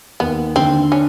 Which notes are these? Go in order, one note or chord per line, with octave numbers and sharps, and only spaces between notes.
D#2 B3
D3 C4
C#4 D4